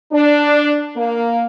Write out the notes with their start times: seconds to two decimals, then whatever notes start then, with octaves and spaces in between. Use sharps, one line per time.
0.12 D4
0.96 A#3